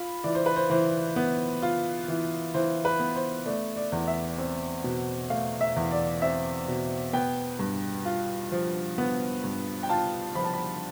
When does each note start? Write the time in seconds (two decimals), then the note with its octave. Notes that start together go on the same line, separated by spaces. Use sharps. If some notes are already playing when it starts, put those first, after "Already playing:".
Already playing: F4 B5
0.24 E3 D5
0.35 C5
0.46 B4
0.56 C5
0.70 E3 C5
1.16 B3
1.62 F4
2.08 E3
2.54 E3 C5
2.85 B4
3.00 B3
3.16 C5
3.45 A3 D5
3.76 D5
3.92 E2
4.08 E5
4.38 C4
4.84 B2
5.30 A3 F5
5.61 E5
5.76 E2
5.91 D5
6.22 C4 E5
6.68 B2
7.13 B3 G5
7.59 G2
8.05 F4
8.52 F3
8.98 B3
9.44 G2
9.83 G5
9.89 F4 A5
10.35 F3 B5
10.44 A5
10.53 B5